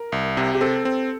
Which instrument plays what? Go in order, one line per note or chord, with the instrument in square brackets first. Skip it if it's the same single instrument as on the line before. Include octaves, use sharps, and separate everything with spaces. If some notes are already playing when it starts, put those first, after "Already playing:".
Already playing: [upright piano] A#4
[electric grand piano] C2
C3
[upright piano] G4
[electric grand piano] C4 [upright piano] A4
[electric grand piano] C4